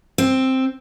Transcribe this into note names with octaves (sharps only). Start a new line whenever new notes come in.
C4